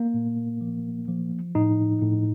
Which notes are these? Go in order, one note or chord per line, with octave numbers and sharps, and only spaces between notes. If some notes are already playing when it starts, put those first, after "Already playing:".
Already playing: A#3
A#2
F3
F3
A2 D#4
A2